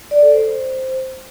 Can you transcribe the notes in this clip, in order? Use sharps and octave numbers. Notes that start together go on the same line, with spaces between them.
D5
A4
C5